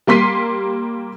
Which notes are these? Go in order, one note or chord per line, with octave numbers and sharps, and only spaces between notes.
G3 A#3 C6 B6 C7 D#7